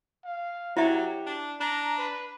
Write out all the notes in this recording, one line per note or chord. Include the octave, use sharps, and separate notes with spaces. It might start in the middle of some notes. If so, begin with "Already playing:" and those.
F5
F#3 E4 G4 E5
D4
D4 A#5
B4